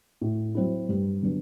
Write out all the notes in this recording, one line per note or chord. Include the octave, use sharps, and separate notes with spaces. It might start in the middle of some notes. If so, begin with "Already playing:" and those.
A2
F#3 C4 E4
G2
D3 F#3 B3 D4